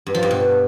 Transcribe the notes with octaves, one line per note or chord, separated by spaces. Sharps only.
G2
F3
G2
B2